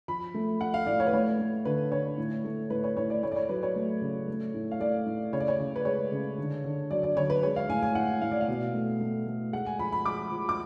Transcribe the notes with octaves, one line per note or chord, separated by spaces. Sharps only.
F3 B5
A3
A3 F#5
F5
A2 D5
C#5
B4
A3 C#5
A3
D3 B4
D3 C#5
A2
A3
A2 B4
C#5
A2 C#5
D5
A3 C#5
D5
C#5
F#3 B4
C#5
A3
C#3
A3
A2
F5
A3 D5
A2
C#3 C#5
D5
C#5
C#3
B4
G#3 C#5
C#3
D3
D3
F#3 D5
D5
D3 C#5
B4
G#3 C#5
F5
A2 G#5
G#5
A2 F#5
A2 F5
D5
F5
B2
A3
A3
A3
G#3 F#5
G#5
F3 B5
B5
G#3 D6
F3
D6